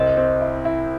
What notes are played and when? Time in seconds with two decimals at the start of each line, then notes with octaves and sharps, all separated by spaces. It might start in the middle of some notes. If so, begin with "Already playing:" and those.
Already playing: C2 C4 D#5
0.17 C4
0.41 E4
0.65 E4